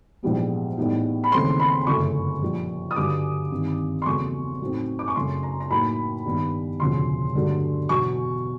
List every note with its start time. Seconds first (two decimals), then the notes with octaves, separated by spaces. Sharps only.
0.23 A#1 G#2 E3 G3 B3
0.78 A2 E3 G3 B3 D#4
1.24 B5
1.32 D#2 C#3 E3 A3 C4 C6
1.60 B5
1.87 G1 F#2 C#3 E3 A3 C#6
2.42 A#1 A#2 G3
2.91 D#6
2.96 G2 D3 F#3 D6
3.51 G#1 G2 D#3
4.02 C6
4.06 E2 C#3 F#3 A3 C#6
4.61 A2 F#3 A3 C4 D#4
4.99 D6
5.08 C#6
5.16 F#2 C#3 F#3 A3 C6
5.43 A#5
5.60 A#5
5.71 A2 F#3 A#3 D#4 B5
6.25 G2 D#3 G3 B3
6.80 E1 D2 C#3 F3 C6
7.35 G2 D3 F#3 A3 D4
7.89 E2 B2 F#3 C#6